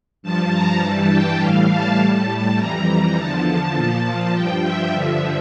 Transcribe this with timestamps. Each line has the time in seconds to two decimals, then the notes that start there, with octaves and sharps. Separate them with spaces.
0.22 G2 F3 A5
0.52 A#5
0.81 G2 E3 G3 A5
1.10 G5
1.40 A2 E3 G3 F5
1.69 A5
1.98 A2 G3 A5
2.58 F2 E3 G3 A#5
3.16 E2 D3 F3 A5
3.75 A#2 F3
4.34 G2 F3 G5
4.64 E5
4.93 G2 D3 F3